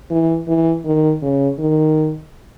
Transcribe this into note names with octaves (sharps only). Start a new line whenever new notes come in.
E3
E3
D#3
C#3
D#3